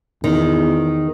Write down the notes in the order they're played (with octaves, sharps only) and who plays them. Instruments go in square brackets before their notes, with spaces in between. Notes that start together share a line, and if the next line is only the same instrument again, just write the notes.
[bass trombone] E2 [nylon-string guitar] D#3